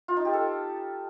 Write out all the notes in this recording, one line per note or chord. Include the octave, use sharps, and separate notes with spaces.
F4
D#4
G4
A4